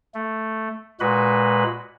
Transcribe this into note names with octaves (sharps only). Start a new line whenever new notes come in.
A3
A#2 G#3 F#4 B4 B5